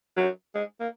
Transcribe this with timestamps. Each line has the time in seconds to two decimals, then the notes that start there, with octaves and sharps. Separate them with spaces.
0.17 F#3
0.55 G#3
0.80 A#3